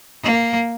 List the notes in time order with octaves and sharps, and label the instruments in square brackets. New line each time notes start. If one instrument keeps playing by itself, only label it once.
[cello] A#3